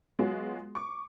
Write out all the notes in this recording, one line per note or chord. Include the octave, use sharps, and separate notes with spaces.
F#3 G#3 B3 F4 F#4 G#4
C#6 D6